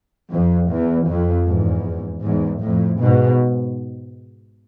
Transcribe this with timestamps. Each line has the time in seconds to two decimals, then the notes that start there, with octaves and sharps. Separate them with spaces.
0.31 F2
0.70 E2
1.08 F2
1.47 E2 G#2
2.24 E2 G#2
2.62 F2 A2
3.01 G#2 B2